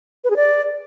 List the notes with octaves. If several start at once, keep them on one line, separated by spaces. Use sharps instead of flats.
B4
G#4
D5